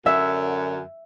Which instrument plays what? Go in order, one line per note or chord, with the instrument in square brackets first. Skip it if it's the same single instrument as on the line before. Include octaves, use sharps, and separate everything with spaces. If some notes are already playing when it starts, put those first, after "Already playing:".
[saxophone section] F#2 D3 [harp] E5